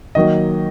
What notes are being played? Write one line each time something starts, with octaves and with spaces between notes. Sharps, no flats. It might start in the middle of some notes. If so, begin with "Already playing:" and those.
D#3 F#3 A#3 D#5